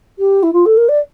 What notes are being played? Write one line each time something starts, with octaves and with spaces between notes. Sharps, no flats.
G4
E4
F4
A4
A#4
D5